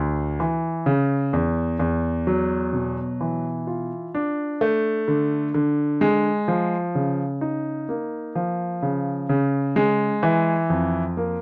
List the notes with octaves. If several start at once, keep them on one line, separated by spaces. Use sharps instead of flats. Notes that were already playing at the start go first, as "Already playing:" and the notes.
Already playing: D2
E3
C#3
E2
E2
F#3
B2
E3
F4
D4
A3
D3
D3
G#3
F3
C#3
D#4
A#3
F3
C#3
C#3
G#3
E3
F2
A#3